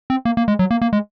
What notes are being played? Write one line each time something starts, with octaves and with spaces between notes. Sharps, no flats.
C4
A#3
A#3
G#3
F#3
A#3
A#3
G#3